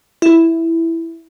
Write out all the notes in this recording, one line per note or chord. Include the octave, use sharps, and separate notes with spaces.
E4